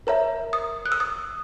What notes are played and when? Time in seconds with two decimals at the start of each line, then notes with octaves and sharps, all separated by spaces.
0.07 A#4 C#5 E5 A#5
0.53 D#6
0.86 F#6
0.92 E6
1.00 D#6